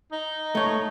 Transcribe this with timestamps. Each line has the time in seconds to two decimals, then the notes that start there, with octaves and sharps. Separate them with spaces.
0.12 D#4
0.55 A3 C#5